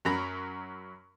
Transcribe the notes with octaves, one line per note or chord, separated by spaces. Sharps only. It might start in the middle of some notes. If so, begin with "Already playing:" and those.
F#2 F#3 A#5 B5